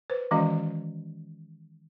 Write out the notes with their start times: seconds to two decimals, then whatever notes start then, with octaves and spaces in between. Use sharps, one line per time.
0.10 B4 C5
0.31 D#3 E3 G#3 C#4 F#4 D#5